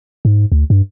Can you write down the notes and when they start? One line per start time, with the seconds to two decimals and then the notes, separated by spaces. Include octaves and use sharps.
0.25 G#2
0.52 D2
0.70 G2